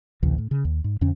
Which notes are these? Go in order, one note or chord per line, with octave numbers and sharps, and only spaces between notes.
A1 D2 C3 E3
A2
C#3
D#2
G#2
F2 D3 C#4